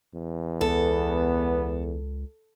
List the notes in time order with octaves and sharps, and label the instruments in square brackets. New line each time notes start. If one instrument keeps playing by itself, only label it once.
[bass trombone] E2
[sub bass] C#2 [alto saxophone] B3 [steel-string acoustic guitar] A4